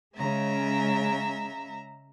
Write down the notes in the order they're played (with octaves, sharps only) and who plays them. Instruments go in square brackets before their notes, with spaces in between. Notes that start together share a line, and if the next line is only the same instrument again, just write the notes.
[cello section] C#3 G#3 [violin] E5 A#5